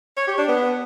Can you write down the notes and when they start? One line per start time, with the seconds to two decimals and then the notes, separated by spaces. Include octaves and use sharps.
0.17 C#5
0.27 G4
0.38 D4
0.48 B3